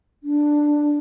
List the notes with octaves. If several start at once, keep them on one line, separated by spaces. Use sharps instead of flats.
D4